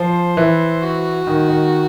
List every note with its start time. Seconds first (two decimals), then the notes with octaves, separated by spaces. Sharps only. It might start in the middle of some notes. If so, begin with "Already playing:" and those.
Already playing: F3 C5
0.37 E3
0.82 F#4
1.27 D#3
1.48 D#3